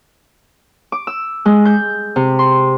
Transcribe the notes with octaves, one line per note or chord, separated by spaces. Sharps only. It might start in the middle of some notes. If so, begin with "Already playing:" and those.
D6
E6
G#3
G6
C3
C6